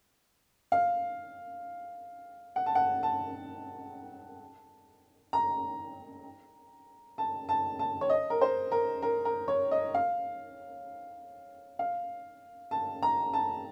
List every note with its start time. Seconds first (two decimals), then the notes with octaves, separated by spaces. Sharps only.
0.72 F5
2.56 F#5
2.66 A5
2.75 F#5
3.03 A5
5.33 A#5
7.18 A5
7.49 A5
7.79 A5
8.01 C#5
8.10 D#5
8.30 A#4
8.41 C5
8.72 A#4
9.02 A#4
9.25 A#4
9.48 C#5
9.71 D#5
9.94 F5
11.79 F5
12.71 A5
13.02 A#5
13.33 A5